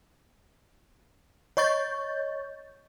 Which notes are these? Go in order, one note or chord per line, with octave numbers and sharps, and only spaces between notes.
C#5 D#5 C#6 G6 A6